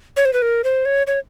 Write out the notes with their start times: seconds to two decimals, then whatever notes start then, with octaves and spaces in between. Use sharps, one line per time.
0.17 C#5
0.25 C5
0.33 B4
0.42 A#4
0.64 C5
0.85 C#5
1.07 C#5